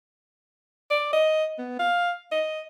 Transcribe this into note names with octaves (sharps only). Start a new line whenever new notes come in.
D5
D#5
B3
F5
D#5